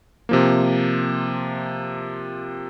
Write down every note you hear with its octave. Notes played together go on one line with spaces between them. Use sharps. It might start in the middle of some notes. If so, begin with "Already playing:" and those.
C3 F3 A#3